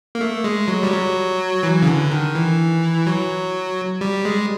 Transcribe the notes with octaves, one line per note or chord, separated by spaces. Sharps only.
A#3
A3
G#3
F#3
G3
F#3
E3
C#3
D3
D#3
E3
F#3
G3
G#3